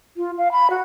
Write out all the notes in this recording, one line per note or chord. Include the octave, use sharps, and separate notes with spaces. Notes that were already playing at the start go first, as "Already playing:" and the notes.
F4
F5
B5
F#4